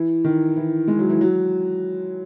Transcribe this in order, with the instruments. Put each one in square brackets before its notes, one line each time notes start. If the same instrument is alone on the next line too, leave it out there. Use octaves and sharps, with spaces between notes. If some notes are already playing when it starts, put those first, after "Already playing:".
Already playing: [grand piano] E3
D#3
E3
G#3
F#3
E3
F#3